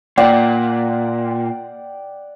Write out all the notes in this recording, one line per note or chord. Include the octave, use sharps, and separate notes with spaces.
A#2 D5 F#5 G5